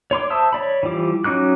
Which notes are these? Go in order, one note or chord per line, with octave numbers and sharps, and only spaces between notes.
C#5 C6 D6
C5 E5 A5 D#6 E6
C#5 D5 B5
E3 F3 G3 D6
F#3 C#4 D#4 D6 F#6